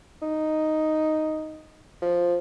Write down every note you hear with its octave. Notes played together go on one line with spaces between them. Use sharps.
D#4
F3